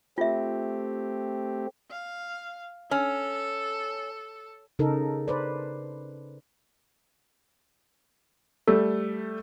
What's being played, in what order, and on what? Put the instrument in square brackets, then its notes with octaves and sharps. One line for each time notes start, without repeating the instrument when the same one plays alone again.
[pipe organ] A3 C4 G4 [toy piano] F4 E5
[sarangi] F5
[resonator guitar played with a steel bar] C#4 [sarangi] A4
[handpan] C#3 D#4 A4 A#4
B4 C5 D5
[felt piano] G3 A3 [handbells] A4